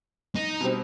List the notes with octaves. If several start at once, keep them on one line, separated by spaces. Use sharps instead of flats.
D#4
B2 G3 C4